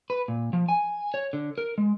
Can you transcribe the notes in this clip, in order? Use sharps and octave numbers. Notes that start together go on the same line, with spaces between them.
B4
A#2
F3
G#5
C#5
D3
A#4
G#3